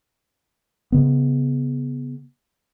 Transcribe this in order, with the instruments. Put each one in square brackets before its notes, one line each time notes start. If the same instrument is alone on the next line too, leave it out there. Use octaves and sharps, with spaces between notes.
[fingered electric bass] C#3 B3